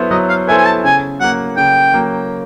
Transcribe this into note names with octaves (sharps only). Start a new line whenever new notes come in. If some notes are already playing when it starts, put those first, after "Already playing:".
Already playing: F#3 B3 E4 A4 C5
F#3 D#5
F5
B3 E4 A4 C5 G#5
G#5
A5
C#3 G#5
F#3 A#3 F#5
C#3 G5
F#3 A#3